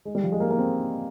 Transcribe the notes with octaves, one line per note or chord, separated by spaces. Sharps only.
G#3
G3
F3
G#3
A#3
A#3
C4